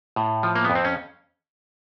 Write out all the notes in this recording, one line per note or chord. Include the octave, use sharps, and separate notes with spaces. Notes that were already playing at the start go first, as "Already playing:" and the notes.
A2
F3
A#3
B3
F2
C4
C#4